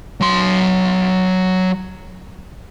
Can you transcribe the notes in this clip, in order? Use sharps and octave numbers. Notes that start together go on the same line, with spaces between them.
F#3 C6